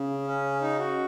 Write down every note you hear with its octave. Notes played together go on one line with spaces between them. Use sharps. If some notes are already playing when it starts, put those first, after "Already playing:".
Already playing: C#3
C#4
D#4
F#4